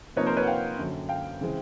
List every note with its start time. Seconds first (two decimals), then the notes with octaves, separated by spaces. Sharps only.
0.16 C3 F3 A#3 D#4 B4 C#5
0.27 A#4 C5
0.37 B4 C#5
0.43 F#5
0.47 F5 G5
0.78 F#2 D3 F#3
1.09 F5 G5
1.41 C#3 E3 G#3 C4